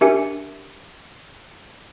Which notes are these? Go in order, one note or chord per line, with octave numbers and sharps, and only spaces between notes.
D4 G4 A#4 E5 G#5 C#7